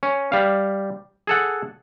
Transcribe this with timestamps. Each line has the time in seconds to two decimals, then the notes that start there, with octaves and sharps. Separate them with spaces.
0.03 C#4
0.32 G3 F5
1.27 G#4 A4 F#5